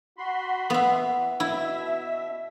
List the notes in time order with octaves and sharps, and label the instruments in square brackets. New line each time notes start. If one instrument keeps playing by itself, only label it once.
[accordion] F#4 B5 C6
[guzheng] B3 E5
[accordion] E3
[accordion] B2 E5 [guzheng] E4